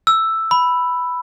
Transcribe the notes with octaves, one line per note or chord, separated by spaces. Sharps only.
E6
B5